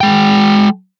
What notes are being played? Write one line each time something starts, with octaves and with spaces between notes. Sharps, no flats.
G#3 G5